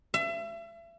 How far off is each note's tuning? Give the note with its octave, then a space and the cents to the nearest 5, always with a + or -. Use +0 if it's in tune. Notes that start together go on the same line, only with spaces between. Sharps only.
E5 +35